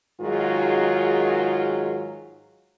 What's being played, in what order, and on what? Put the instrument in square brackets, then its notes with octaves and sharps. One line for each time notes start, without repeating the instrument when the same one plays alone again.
[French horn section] G#2 D#3 F#3 F4 F#4 G#4